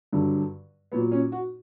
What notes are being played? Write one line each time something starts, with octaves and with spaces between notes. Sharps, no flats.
G2 D3 F#3
A#2 F#3 B3
C#4
F#4